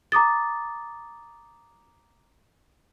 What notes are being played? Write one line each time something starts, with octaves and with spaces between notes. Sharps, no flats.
A#5 D6 D#6 A6